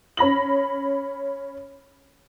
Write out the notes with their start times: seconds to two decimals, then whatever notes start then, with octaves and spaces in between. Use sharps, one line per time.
0.17 C#4 B5 A#6 F#7